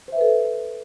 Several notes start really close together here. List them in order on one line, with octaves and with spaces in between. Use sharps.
C5 E5 B4 A4